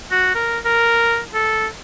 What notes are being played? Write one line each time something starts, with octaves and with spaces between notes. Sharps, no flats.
F#4
A#4
A#4
A4